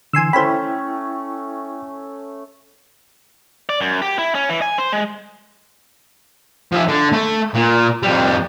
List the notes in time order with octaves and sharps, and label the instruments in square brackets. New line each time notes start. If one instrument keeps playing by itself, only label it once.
[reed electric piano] D3 E3 [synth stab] G#5 C6 E6
[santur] A3 C#4 [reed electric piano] E4 G5 [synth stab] C5 B5
[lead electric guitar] D5
F#2
G4
E4
C#4
E3
G#5
C5
G#3
[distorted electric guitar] F3 E5
D3
A3
A#2
F2 G3